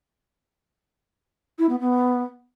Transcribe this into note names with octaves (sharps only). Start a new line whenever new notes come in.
E4
B3
B3